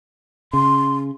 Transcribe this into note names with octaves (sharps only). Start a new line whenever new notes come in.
C#3 C6